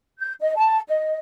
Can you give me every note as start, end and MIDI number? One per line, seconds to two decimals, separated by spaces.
0.20 0.33 91
0.40 0.55 75
0.57 0.80 81
0.88 1.19 75